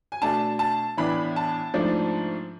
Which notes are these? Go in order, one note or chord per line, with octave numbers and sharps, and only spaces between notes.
G#5
B2 A3 D4 A5
A5
A2 E3 B3 D4 B5
A5
G#2 F3 A3 D4